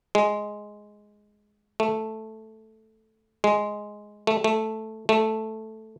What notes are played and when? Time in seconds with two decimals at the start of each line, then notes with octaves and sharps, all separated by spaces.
0.15 G#3
1.80 A3
3.44 G#3
4.27 A3
4.44 A3
5.09 A3